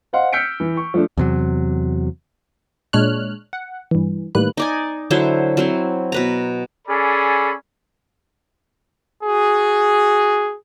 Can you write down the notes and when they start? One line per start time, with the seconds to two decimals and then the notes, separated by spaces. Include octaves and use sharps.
0.13 C5 D#5 F5 F#5 C6
0.33 E6 F6 G6 B6 C#7 D7
0.60 E3
0.77 C#6
0.94 F3 A3 D4
1.18 E2 C3 F#3
2.93 A#2 G#3 D4 C#5 F6 F#6
3.53 F#5
3.91 G2 E3
4.35 A2 D#3 G3 A#3 B4 F#6
4.57 D#4 D5 G#5
5.10 D3 F#3 E4 C5
5.57 F#3 C4 E4
6.12 B2 B4 A#5
6.88 C#4 G#4 A4 D5 B5
9.23 F#4 G#4